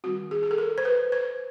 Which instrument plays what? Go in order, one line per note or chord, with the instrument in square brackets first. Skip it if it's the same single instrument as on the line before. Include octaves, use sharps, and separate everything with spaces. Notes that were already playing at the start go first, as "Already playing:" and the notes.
[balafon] D#3 G3 C4 F#4
G#4
G#4
A4
A#4
C5
B4
C5